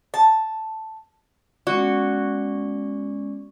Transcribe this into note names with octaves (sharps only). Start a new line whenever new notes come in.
A5
G#3 B3 C#4 F#4 D5 C#6